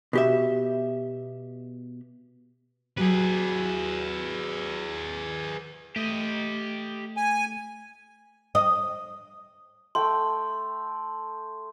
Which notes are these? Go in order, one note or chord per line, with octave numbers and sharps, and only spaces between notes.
B2 G4 E5
F#3 G4 G#4 B4
A3 G4 D#5
G#5
D#5
A3 G5 C6